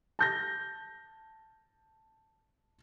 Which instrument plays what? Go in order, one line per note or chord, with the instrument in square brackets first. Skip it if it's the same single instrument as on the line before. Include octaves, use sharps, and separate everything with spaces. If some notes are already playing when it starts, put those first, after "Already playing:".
[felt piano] A5 G6 A#6